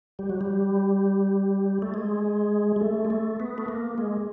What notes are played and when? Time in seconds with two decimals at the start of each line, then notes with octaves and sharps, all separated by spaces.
0.19 G3
0.29 F#3
0.41 G3
1.82 A3
1.94 G#3
2.76 G#3
2.81 A3
3.05 G#3
3.10 A3
3.40 B3
3.58 A3
3.68 A#3
3.98 G#3